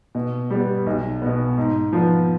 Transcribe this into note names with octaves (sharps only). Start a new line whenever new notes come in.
B2
G3 B3
B1
B2 B3
G#2
F3 B3